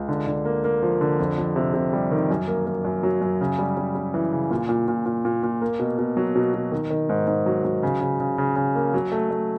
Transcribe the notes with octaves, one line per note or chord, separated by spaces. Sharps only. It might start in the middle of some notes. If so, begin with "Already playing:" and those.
Already playing: C#2
D3
D3
A#3
A#3
F3
D3
F2
F2
C3
C3
G3
D#3
F#2
A#3
A#3
F#2
F#3
F#2
C#3
G3
G3
G3
E3
C#3
A#2
A#2
A#2
A#2
A#2
A#2
A#3
B2
B2
F#3
B2
B2
D#3
D#3
G#2
G#2
F#3
F#3
C#3
C#3
C#3
C#3
C#3
A#3
F#3
A3
A3